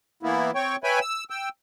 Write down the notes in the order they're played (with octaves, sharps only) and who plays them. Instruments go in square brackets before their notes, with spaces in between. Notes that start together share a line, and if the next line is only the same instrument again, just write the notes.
[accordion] E3 A#3 B3 E4
C4 C#5 G5 C#6
B4 C#5 E5 G5 G#5 B5
E6
G5 E6